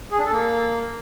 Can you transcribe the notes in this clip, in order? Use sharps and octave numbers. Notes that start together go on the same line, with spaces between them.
G#4
D4
A4
A#3